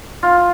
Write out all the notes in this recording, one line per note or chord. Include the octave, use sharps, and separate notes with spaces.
F4